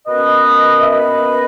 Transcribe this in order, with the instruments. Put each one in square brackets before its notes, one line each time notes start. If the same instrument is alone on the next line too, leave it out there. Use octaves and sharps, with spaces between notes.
[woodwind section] B2 A#3 C#4 B4 D#5
E5
B4 D#5